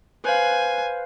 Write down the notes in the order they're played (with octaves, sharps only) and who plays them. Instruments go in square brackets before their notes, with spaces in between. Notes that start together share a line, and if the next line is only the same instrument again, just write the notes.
[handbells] B4 C5 F5 [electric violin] G#5